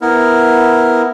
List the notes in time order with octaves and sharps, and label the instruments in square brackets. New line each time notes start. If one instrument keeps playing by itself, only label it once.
[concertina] B3 E4 A#4